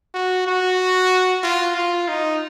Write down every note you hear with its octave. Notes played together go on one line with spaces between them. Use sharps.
F#4
F#4
F4
F4
D#4